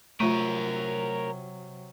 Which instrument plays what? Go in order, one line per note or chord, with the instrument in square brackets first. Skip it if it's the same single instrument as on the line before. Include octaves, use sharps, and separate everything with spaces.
[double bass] C3 F#3 [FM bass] A3 [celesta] F4 C#6 D#7 [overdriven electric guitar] A#4 C#5